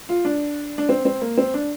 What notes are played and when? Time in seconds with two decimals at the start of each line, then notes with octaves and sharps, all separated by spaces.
0.09 F4
0.25 D4
0.78 D4
0.89 C4
1.05 C4
1.22 A#3
1.38 C4
1.54 D4